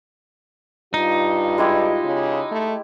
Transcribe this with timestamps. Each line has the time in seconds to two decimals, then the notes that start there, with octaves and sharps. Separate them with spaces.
0.94 G2 D#4 F4
1.58 G#3 E4 G4
2.04 C#3
2.51 A3